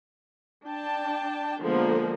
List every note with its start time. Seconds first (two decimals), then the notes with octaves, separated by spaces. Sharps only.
0.67 D4 G5 A5
1.63 D3 F3 G#3 A#3 B3